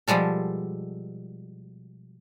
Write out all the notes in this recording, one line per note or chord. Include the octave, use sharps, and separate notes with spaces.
B2 F3 G3 G#3 A4